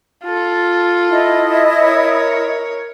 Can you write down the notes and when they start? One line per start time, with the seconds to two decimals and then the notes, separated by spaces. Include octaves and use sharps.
0.23 F4 A4
1.10 E4 D#5
1.79 A#4 C#5